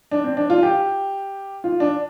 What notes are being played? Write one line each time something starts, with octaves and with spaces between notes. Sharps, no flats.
D4
C4
D4
F4
G4
F4
D4